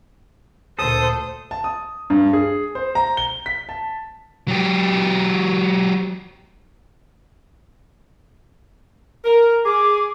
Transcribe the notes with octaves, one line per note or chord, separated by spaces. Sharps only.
D2 A#2 A4 C5 D#6
A5
D#6
G2
G#4
C5
A#5
G7
B6
A5
F#3 G4
A#4
G#4 D6